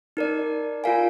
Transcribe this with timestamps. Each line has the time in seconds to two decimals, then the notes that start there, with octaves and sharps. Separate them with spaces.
0.17 D#4 A#4 D5
0.84 F4 A#4 F5 G#5